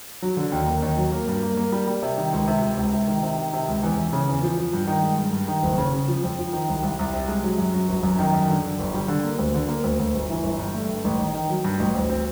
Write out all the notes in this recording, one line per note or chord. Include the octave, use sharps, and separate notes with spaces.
F#3
D3
D#2
A#3
D#2
F#3
A#3
G2
A#3
A#3
G3
G3
C3
D#3
C#2
C3
C#2
C#2
C3
D#3
C3
D#3
C3
C#2
E2
E2
C#3
E2
F3
F3
G2
D#3
G#3
G2
G2
D#3
F#1
C#3
C#3
F3
F2
F3
D#3
C2
C2
C2
C3
G#3
F#3
F#2
F#3
G1
F#2
D#3
F#2
D3
D3
G1
G3
D3
A#3
D2
D3
A#3
D2
D2
G1
E3
G1
G2
A3
G2
A1
D#3
D#3
F#3
G2
A1
D2
C4